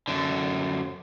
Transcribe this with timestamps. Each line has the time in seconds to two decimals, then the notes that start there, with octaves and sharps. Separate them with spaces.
0.08 F#2 D3